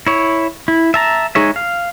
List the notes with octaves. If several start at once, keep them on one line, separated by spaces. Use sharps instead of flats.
E4 C#5
E4
E5 A5 A#5
G#3 D#4 G#4 C#5 E5
F5